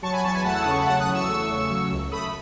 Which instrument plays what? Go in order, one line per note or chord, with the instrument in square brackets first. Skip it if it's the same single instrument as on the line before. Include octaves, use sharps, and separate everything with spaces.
[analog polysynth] F#3 A5 C#6
G#5 B5
E2 A5 C#6
G#5 B5
A3 F#5 A5
E6
D#6
C#3 C#6
B5
F#3 F#5 A5
D#6 F#6
E2
C#6 E6
A3
C#3
F#3
C#2
A3 B5 D#6